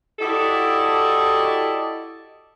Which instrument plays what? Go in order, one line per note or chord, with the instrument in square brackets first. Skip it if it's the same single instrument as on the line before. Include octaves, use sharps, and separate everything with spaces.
[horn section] E4 F#4 G4 A4 D5 D#5